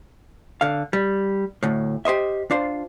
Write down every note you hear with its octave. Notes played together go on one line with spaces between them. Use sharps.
D3 F5
G3
D2 A2
G4 C5 D#5 E5
D4 F4 C5